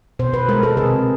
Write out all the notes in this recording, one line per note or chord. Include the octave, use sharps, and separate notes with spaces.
B2 C5
B4
G#3 A#4
A4
C3 G#4